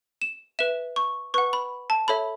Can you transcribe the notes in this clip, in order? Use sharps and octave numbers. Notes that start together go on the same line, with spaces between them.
E7
B4 E5 E7
C#6
B4 F#5 C#6
B5
A5
A4 C#5 E5 B5